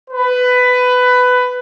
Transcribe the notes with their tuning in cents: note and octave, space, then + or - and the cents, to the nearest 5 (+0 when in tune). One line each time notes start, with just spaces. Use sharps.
B4 +15